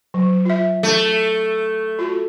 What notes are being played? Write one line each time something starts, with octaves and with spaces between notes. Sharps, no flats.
F#3
F4 E5
A3
F4 F#4 A4